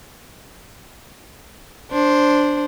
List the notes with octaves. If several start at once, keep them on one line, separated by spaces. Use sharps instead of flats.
D4 C5